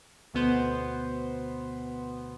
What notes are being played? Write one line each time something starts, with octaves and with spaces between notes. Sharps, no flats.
D2 B2 B3 C5